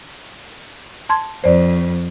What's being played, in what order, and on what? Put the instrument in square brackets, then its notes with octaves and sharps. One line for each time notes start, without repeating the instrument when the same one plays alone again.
[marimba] A5 C6 G#6
[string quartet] F2 [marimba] C5 D5